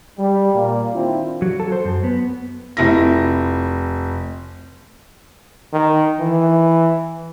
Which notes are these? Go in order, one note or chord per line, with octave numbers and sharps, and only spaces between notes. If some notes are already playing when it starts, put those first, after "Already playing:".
G3
A#2 A#3
D#3 C4 D4 E4 F4
F#3
A4
C5
F#2
B3
F1 E4 A#6
D#3
E3